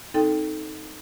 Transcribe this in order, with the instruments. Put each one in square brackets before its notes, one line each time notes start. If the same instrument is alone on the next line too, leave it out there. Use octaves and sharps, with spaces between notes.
[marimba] C4 D#4 A4 G5